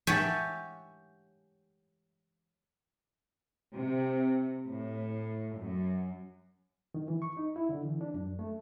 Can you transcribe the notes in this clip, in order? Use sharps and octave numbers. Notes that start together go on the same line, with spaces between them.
G4 C#5 E5 F#5 G#5 A5
C3
A2
F#2
D#3
E3
C#6
D#4
E4
D3
E3
D4
F#2
A3